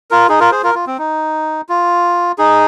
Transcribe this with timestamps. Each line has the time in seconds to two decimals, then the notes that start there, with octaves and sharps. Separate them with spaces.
0.11 F4 A#4
0.29 D#4 G#4
0.40 F4 A#4
0.51 G#4 C5
0.63 F4 A#4
0.75 F4
0.87 C4
0.98 D#4
1.69 F4
2.38 D#4 G#4